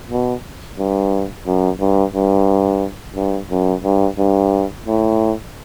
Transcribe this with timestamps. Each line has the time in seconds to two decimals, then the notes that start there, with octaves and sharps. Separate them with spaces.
0.11 B2
0.78 G2
1.47 F#2
1.80 G2
2.15 G2
3.16 G2
3.51 F#2
3.84 G2
4.18 G2
4.86 A2